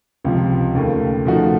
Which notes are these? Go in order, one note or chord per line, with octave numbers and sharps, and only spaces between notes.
C#2 C3 F3
D#2 C#3 A3
C#3 F3 A3 D#4 F#4